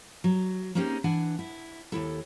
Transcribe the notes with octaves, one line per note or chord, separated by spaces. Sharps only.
F#3
A#3 C4 C#4 D#4 G4 G#4
E3 D4 F#5 G#5
E4
D#2 E4 A4